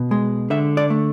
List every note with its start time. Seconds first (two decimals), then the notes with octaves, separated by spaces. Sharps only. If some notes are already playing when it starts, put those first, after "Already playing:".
Already playing: B2
0.11 G#3
0.50 D3 E5
0.77 D5
0.90 A3